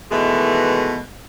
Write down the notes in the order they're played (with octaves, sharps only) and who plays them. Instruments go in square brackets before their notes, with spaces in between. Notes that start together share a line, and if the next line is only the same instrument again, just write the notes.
[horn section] B2 D#3 E3 G#3 A3